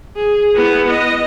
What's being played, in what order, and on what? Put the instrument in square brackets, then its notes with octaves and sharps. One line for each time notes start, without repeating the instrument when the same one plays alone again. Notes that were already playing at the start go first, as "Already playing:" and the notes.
[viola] G#4
B3 E4
D#5